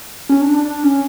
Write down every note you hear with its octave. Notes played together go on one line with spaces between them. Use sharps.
C#4
D4
D4
D4
C#4